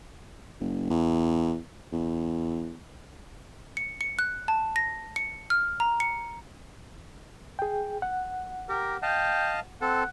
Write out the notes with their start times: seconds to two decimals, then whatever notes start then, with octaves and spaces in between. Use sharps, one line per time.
0.61 F#1
0.90 E2
1.92 E2
3.77 C#7
4.01 C#7
4.19 F#6
4.48 A5
4.76 A#6
5.16 C#7
5.50 F6
5.80 A#5
6.00 C#7
7.59 G#4 G5
8.02 F#5
8.69 G4 A#4
9.02 D#5 F5 G5 A5
9.81 C4 A4 F#5